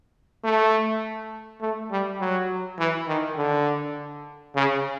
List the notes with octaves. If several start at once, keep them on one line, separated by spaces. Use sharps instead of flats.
A3
A3
G3
F#3
E3
D#3
D3
C#3